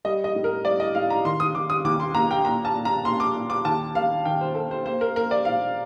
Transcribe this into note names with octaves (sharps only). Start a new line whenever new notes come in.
G3 D#5
D#5
A2
A#4
G3 D5
D#5
A2 F5
A#5
D#3 C6
D#6
D#3 D6
D#6
D#2 D6
C6
A#3 A#5
G5
A#2 A#5
A5
A#2
A#5
A#2 C6
D6
A#2
D6
D#2 A5
D#3 F5
D#3 G5
C5
A#3 A4
C5
A#3 C5
A#4
A#3 A#4
D5
A#2 F5